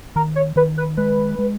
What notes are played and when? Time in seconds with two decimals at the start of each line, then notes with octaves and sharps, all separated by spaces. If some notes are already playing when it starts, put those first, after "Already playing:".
0.16 D#3 A#4
0.36 C#5
0.56 D#3 B4
0.77 B4
0.97 G#3 B4
1.39 G#3